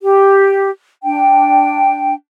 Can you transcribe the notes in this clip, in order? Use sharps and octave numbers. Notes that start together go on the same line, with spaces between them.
G4
D4 G5